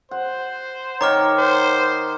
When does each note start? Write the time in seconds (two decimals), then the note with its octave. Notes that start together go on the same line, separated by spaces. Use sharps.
0.11 C5 F#5
1.01 D#3 C#5 A#5 D6 F6
1.37 C5